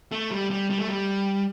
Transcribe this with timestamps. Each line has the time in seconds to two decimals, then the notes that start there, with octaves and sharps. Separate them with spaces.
0.12 A3
0.31 G3
0.51 G3
0.70 G3
0.79 A3
0.88 G3